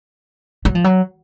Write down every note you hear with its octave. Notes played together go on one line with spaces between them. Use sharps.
F#3
F3
F#3